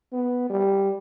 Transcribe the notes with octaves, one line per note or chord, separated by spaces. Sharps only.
B3
G3